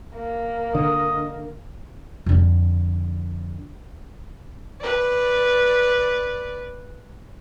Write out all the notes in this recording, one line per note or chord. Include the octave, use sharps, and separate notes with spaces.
A#3
D3 D#5
F2 D3
B4 D5